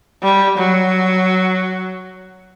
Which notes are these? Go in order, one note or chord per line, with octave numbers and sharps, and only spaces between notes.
G3
F#3